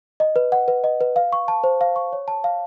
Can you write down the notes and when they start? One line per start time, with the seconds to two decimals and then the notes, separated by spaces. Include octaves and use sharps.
0.20 D#5
0.36 B4
0.52 F#5
0.68 B4
0.84 D#5
1.01 B4
1.16 F5
1.33 C#6
1.48 A5
1.64 C5
1.81 F5
1.96 C#6
2.13 C#5
2.28 A5
2.44 F5